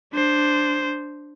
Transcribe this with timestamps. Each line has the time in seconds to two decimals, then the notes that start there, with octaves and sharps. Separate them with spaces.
0.13 D4 C5